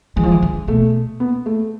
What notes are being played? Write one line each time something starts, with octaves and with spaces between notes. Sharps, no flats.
E3 G#3
F3
E3
D3
B2 A3
B3
A3